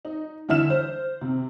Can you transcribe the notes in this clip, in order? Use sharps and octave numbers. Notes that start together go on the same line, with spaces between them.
D#4
D3 E3 E5 F6 E7
C5
C3